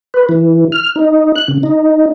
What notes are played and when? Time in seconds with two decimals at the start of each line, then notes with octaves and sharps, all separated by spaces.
0.14 B4
0.29 E3
0.72 F6
0.96 D#4
1.36 F#6
1.48 C#3
1.63 D#4